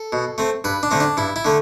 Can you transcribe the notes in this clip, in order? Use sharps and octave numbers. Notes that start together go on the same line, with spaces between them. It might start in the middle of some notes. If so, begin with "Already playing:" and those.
Already playing: A4
B2
A3 C4
G2 B4
D4
D3 A3 C4
D4
G2 E4
E4
D3 A3